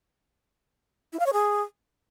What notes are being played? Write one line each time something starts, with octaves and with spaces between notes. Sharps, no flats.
E4
F5
C#5
G#4